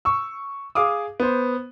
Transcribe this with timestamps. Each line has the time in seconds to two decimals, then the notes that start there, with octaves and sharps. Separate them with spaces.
0.05 C#6 E6
0.75 G#4 F5 D6 D#6
1.20 B3 C5